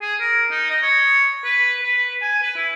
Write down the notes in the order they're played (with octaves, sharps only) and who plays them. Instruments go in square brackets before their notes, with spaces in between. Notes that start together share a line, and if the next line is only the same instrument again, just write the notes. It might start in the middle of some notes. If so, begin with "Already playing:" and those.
[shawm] G#4
A#4
D#4
D#5
C#5
B4
B4
G#5
B4
E4